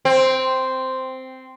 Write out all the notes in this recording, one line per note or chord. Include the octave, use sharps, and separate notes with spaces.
C4